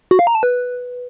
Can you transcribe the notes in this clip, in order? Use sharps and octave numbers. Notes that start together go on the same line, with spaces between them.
F#4
F5
A#5
A5
B4